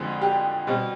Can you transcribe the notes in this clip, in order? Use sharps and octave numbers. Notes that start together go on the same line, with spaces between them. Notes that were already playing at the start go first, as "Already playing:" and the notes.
Already playing: F2 D3 F3 G#3 G#4
G4
B2 G3 C4